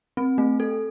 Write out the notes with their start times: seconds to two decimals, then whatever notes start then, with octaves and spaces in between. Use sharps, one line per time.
0.17 C4
0.38 A3
0.60 A4